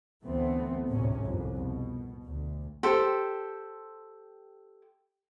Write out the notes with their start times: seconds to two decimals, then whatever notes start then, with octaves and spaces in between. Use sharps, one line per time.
0.24 D2 E3 A3 B3 C4
0.90 G#1 D2 A2 C3 C#4
1.24 C2 F2
1.59 B2
2.25 D2
2.83 G4 A4 C5